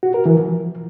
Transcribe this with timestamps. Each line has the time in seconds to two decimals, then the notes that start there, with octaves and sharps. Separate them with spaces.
0.03 F#4
0.14 A#4
0.26 E3
0.37 F3